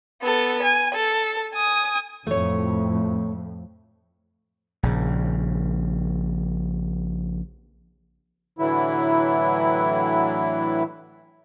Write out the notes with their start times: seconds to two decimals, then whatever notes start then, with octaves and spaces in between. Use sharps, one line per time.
0.22 B3 A4
0.63 G#5
0.95 A4
1.54 G#5 D#6
2.27 F2 A2 A3 C#5
4.83 A#1 C#3
8.59 A2 D3 E3 F#3 E4